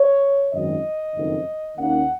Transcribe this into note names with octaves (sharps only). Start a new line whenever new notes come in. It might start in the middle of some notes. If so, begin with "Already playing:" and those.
Already playing: C#5
G#1 F#2 D#3 D#5
F#1 F2 D#3
D#2 D#3 A#3 C#4 F#5